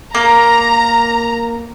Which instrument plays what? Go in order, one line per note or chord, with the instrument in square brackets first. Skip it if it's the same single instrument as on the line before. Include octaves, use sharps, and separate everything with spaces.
[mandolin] A#3 [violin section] A#5